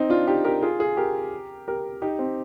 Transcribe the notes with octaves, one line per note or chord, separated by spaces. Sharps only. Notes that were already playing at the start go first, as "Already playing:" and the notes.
Already playing: C4 D#4
D4 F4
D#4 G4
G4 A#4
F4 G#4
F4 G#4
G4 A#4
G4 A#4
D#4 G4
C4